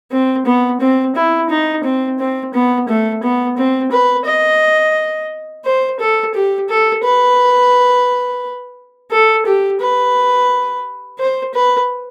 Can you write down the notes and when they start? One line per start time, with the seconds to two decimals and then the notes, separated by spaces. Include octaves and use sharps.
0.11 C4
0.46 B3
0.80 C4
1.15 E4
1.50 D#4
1.84 C4
2.19 C4
2.54 B3
2.88 A3
3.23 B3
3.57 C4
3.92 B4
4.26 D#5
5.65 C5
6.00 A4
6.34 G4
6.69 A4
7.04 B4
9.11 A4
9.46 G4
9.81 B4
11.18 C5
11.54 B4